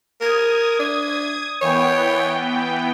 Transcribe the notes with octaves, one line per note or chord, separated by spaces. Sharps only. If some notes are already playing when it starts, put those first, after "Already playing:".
A#4 D#6 G#6
D4
E3 B3 C#5 G5